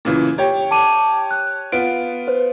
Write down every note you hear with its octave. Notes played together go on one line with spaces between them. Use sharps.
A#2 C#3 E3
G4 C#5 G5
A5 D6 D#7
F#6
B3 F4 D7
B4 C5